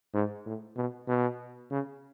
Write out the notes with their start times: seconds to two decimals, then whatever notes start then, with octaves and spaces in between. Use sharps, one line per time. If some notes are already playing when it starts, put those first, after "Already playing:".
0.14 G#2
0.46 A2
0.77 B2
1.08 B2
1.71 C#3